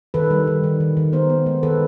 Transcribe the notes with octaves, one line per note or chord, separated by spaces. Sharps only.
D#3 A4 B4
G3
D#3
D#3
D#3
D#3
B3 A#4 C5
B3
G#3
D#3 A4 B4